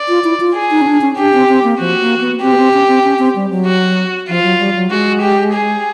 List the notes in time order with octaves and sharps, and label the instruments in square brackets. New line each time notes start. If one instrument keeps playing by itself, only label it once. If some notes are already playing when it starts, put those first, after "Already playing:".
Already playing: [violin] D5
[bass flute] F4
E4
F4
[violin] G#4
[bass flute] D#4
C#4
D4
C#4
[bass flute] D4 [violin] G4
[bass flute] C4
C4
A#3
[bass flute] F3 [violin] F#4
[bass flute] A#3
B3
[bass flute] C4 [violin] G4
[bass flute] B3
C4
C#4
C4
C#4
C4
G3
F#3
[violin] F#4
[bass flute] F3 [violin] F4
[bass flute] F#3
G3
F#3
[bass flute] G#3 [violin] F#4
[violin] G4
G#4